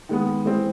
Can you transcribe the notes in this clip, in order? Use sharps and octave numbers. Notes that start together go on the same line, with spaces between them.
D#3 G#3 B3
E3 G#3 C4